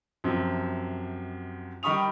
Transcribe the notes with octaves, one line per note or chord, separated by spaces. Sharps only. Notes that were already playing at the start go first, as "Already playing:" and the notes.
F#2 C3 F3
D#3 G3 B5 C#6 D#6 F7